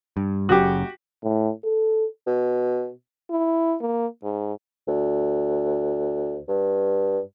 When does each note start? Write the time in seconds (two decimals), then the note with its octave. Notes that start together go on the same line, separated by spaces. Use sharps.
0.17 G2
0.49 F#1 F#2 C#3 F#4 G4
1.23 A2
1.64 A4
2.27 B2
3.31 E4
3.81 A#3
4.24 G#2
4.88 D2
6.48 G2